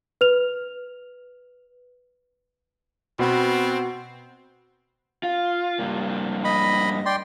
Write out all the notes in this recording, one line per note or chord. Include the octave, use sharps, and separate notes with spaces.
B4 F6 F7
B2 B3 C4
F4
G2 A#3
D#5 B5
D5 G5 C6